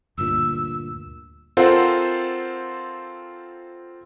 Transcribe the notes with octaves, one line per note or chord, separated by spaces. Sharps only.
D2 G2 A#2 E6
C4 F4 A4 A#4 C5 F#5